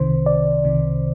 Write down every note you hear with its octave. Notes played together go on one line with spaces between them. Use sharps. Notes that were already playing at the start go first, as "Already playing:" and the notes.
Already playing: C2 C3 D#3 C5
D5
C2 C3 D#3